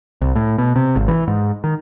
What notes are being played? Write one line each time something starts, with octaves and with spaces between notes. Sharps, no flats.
C2
A2
B2
C3
G#1
E3
G#2
D#3